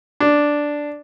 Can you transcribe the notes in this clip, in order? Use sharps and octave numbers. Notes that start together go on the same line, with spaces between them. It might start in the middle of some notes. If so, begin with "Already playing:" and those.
D4